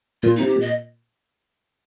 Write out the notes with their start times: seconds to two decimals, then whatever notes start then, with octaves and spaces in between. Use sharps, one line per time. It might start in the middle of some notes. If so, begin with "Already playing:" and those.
0.23 A#2 F4
0.36 C3 D#4
0.48 G4
0.56 A#2 D#5